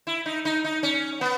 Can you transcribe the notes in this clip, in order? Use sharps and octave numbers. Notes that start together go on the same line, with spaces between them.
E4
D#4
D#4
D#4
C#4
B3